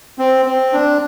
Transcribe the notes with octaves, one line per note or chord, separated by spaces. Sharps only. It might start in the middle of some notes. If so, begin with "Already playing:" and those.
C4
C4
D4